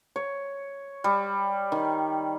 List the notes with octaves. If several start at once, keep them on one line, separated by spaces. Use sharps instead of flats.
C#5
G3
D#3